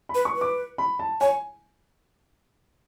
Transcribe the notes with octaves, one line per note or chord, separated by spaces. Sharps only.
B5
B4
C#6
B4
D6
B5
A5
C#5 G#5